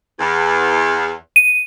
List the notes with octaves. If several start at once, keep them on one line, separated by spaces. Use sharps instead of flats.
E2
D#7